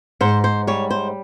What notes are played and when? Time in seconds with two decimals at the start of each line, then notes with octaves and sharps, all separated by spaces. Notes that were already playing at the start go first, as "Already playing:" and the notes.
0.21 G#2 C5
0.44 C5
0.67 G3 C#5
0.90 C5